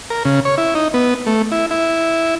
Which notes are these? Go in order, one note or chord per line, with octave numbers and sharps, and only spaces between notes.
A#4
C#3
C#5
E4
D#4
B3
A3
E4
E4